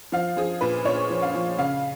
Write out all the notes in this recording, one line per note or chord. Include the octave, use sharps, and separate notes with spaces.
F3 F5
F3 G#4
A#2 B4
A#2 C#5
F3
F5
F3
C#3 F5